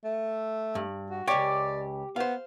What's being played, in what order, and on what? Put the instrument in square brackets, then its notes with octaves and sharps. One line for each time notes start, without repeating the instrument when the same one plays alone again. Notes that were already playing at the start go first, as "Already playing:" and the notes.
[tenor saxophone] A3
[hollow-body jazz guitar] G2
[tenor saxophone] F#4
[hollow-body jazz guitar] C#2 C#5 [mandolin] G4 [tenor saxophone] D5
[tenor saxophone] B3 [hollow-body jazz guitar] C5 F5